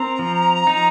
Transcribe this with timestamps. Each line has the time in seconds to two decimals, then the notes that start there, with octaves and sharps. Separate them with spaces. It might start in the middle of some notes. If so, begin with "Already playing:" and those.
Already playing: C4 A#4 A#5
0.19 F3
0.67 D#4